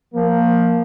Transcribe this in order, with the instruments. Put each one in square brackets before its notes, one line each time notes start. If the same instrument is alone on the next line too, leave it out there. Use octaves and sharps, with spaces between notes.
[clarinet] F3 [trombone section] A#3